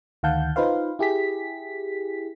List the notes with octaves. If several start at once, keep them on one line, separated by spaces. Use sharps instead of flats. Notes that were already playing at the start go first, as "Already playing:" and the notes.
D2 D#3 F5 F#5 A5 G6
D#4 F4 B4 C5 F5
E4 G4 G#4 B6